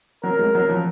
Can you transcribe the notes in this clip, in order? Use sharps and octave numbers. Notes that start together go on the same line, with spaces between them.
F#3 A#4
G#3
F#3
F3